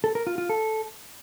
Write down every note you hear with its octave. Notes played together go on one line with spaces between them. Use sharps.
A4
A#4
F4
F4
A4